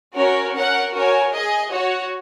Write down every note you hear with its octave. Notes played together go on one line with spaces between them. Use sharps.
C#4 F#4 A#4 C#5
C#4 A#4 F#5
F#4 A#4 C#5 G#5
G#4 D#5 G#5
F#4 C#5 F#5